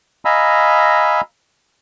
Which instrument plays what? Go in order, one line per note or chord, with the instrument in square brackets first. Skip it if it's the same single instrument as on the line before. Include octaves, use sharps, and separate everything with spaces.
[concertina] D#5 F5 G#5 A#5 B5 E6